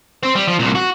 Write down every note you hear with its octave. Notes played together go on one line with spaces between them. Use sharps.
C4
G3
F3
C2 A#2
F#4